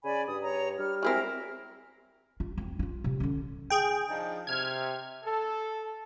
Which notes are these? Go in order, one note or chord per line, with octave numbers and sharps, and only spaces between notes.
C#3 D5 G#5 B5
G2 D#6
C#5 A#5
G3 F6
F#3 G#3 C4 E4 A#4 F6
F4
F1 C4
E4 F4
C3
D3 C#4
G#4 G5
F3 D4 D#4
C3 F6 G#6
A4